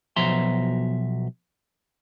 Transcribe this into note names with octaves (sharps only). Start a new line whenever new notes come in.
B1 B2 F3 E5 A#5 C6